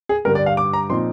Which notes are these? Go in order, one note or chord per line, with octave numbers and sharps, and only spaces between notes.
G#4
G2 D3 G3 A#4
D5
F5
D6
A#5
A#2 F3 C4 D#4 C6